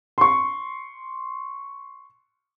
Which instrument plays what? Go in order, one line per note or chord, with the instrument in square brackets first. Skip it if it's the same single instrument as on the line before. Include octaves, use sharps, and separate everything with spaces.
[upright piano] C6 C#6